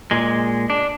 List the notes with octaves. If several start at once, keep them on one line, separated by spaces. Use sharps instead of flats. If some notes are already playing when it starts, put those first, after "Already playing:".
A#2 G#3
D4